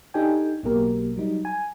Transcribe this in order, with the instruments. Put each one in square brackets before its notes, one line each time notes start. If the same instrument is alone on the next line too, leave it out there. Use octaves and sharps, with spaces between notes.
[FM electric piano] D4 D#4 G4 A4 G5 G#5
B1 B2 F#3 A#3 G4 A#4
F#3 G3 D#4
G#5